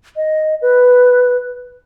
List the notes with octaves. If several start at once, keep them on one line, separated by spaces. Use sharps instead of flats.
D#5
B4